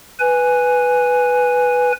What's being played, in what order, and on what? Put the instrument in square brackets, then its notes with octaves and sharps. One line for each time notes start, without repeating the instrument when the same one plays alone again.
[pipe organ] B4 G#5